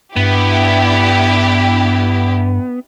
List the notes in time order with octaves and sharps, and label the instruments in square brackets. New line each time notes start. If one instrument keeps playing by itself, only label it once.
[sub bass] G2 [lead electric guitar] B3 [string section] D4 E4 G4